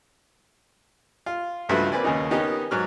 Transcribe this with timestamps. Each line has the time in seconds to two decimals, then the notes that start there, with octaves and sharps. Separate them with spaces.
1.26 F4
1.69 C#2 G2 F3 A3 F#4 B4
1.92 A#3 C4 B4 D5 G#5
2.04 D#2 C#3 C#4 D#4
2.31 D#3 B3 C#4 D#4 G4
2.71 G#2 F#3 F6